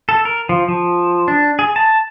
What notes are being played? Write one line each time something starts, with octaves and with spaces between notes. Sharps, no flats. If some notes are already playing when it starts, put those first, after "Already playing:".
A4
A#4
F3
F3
D4
G#4
A5